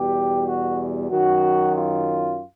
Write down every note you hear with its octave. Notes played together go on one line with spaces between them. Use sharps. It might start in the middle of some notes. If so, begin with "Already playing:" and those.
Already playing: E2 B2 G3 G4
F#4
F#2 D#3 F#3 F#4
F4